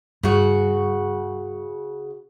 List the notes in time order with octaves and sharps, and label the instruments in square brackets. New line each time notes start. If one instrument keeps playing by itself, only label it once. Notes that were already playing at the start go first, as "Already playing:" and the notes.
[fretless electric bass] G2 [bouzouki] C#3 F#4